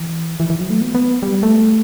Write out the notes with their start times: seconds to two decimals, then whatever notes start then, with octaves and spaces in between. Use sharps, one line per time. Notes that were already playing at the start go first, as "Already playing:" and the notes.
Already playing: E3
0.40 E3
0.50 E3
0.61 F#3
0.70 A3
0.81 B3
0.95 B3
1.23 G3
1.43 A3